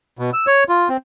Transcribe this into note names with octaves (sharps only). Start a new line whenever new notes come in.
B2
E6
C#5
F4
C4